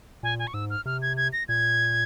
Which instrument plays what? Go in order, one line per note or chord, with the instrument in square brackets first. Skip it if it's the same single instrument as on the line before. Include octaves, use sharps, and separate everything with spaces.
[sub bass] A#2 [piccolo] G#5
[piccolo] G#5
C#6
[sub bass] G#2 [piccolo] E6
[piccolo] F6
[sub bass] C3 [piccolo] F6
[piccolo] G#6
G#6
A#6
[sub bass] A#2 [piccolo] G#6